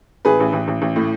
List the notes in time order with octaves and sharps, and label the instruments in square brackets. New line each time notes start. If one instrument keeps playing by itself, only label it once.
[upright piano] A1 G#4 B4
A1
A1
A1
A1
A2